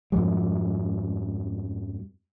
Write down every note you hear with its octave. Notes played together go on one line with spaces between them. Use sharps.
F2 G#2 F3 G3